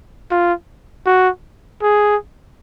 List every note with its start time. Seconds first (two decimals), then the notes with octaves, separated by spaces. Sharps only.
0.31 F4
1.06 F#4
1.82 G#4